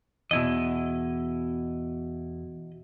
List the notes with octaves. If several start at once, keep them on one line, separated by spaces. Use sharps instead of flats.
E2 B2 E4 D#5